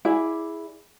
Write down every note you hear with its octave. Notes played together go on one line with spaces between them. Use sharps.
E4 G#4 D5